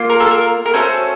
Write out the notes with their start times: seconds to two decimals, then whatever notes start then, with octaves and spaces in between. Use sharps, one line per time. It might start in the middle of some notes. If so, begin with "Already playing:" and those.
Already playing: A#3 F4
0.09 A#4
0.20 A4
0.31 A#4
0.65 A#4
0.73 A3 C#4 F#4 A4 C5